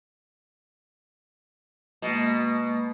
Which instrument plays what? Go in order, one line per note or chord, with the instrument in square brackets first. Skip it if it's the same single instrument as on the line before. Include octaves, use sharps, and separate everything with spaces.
[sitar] B2 [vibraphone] G#3 A#3